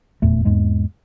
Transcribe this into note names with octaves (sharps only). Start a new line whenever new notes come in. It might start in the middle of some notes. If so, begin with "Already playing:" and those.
F1 E2 A#2 A3
E2 G#2 G#3 A#3